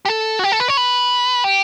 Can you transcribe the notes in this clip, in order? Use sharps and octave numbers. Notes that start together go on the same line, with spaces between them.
G4
A4
F#4
G4
A4
B4
C#5
B4
G4